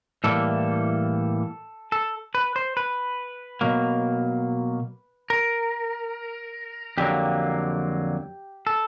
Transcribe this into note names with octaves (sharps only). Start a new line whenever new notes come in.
A2 E3 G3 A#3 A4
A4
B4
C5
B4
B2 F#3 A#3
A#4
F2 D3 F#3 A#3 G4
A4